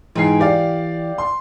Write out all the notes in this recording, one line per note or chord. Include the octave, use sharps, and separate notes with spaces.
G#2 E3 G5 G#5 C7
G4 D5 F5
C6